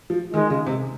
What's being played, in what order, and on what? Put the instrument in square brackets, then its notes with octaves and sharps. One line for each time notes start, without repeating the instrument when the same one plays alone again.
[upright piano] F3
[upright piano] D#3 [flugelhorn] G#3
[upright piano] C#3
C3